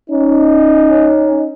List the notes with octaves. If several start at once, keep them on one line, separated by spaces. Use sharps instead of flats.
C#4 D#4